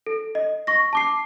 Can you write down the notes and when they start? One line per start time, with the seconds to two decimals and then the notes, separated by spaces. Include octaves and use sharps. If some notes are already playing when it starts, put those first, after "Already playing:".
0.06 A4
0.35 D#5
0.67 C#6 A#6
0.93 A5 D6 C7